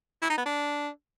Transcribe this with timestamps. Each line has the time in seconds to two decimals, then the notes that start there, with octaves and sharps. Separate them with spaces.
0.22 E4
0.30 D#4
0.38 B3
0.46 D4